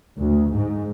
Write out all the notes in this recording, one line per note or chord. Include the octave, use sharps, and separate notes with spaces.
D2
G#2